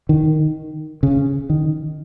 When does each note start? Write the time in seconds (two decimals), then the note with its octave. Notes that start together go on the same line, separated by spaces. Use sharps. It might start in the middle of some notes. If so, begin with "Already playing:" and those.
0.09 D#3
1.03 C#3
1.50 D#3